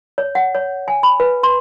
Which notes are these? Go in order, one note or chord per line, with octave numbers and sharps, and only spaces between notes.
C#5
F#5
C#5
G#5
B5
B4
C6